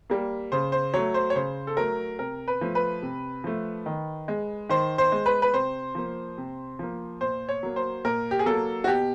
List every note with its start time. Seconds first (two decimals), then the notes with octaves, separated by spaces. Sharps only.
0.10 G3 A#3
0.52 C#3 C5
0.72 C5
0.94 F#3 A3 C#5
1.14 C5
1.30 C#5
1.36 C#3 C5
1.67 A4
1.77 F#3 A3 A#4
2.19 C3 A#4
2.48 B4
2.61 F3 A3
2.75 B4
3.02 C3
3.44 F3 A3
3.86 D#3
4.28 G#3
4.69 D#3 C5
4.98 C5
5.12 G#3
5.26 B4
5.42 B4
5.53 C3 C5
5.95 F3 A#3
6.38 C3
6.79 F3 A#3
7.21 A#2 C5
7.49 C#5
7.63 F#3 A#3
7.76 C5
8.05 A#2 A#4
8.31 G4
8.39 G#4
8.46 F#3 A#3 A4
8.84 F#4
8.87 B2 G4